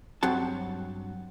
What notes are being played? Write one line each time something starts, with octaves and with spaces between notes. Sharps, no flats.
G2 F#3 C4 F#4 A5